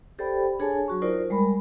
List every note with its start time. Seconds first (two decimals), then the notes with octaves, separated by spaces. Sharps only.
0.19 G4 A4 C5 D5 G5 B5
0.59 D4 G#4 A4 C#5 G#5 A5
0.88 F#3 F#4 C#6
1.02 D#4 F4 A#4 C5 D5
1.30 G3 G#3 A#4 B5